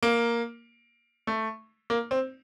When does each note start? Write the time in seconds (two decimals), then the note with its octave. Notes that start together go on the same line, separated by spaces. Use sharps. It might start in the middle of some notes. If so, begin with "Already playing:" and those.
0.03 A#3
1.27 A3
1.90 A#3
2.11 C4